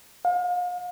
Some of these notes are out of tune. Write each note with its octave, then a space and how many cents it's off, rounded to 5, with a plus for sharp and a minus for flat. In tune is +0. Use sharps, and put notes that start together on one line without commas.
F5 +40